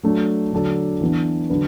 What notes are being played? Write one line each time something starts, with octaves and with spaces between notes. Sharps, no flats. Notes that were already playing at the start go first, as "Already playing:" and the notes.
F#3 A3 D4
D3 F#3 D4 A4
E3 B3 D4
D3 F#3 D4 B4